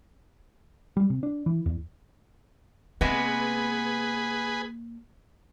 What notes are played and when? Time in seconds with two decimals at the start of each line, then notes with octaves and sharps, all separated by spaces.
0.97 G3
1.10 C3
1.23 D4
1.46 E3
1.66 E2
3.01 C3 G#3 A#3 B3 G#4 B4